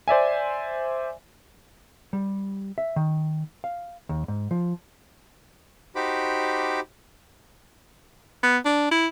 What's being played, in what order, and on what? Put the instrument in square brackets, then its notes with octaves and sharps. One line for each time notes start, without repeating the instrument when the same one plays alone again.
[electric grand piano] C5 D5 E5 G#5
[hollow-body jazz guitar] G3
E5
D#3
F5
D#2
G#2
F3
[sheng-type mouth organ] D#4 F#4 G4 C5 B5 D6
[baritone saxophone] B3
D4
E4